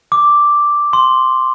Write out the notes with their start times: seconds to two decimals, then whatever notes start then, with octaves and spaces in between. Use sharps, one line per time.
0.12 D6
0.93 C6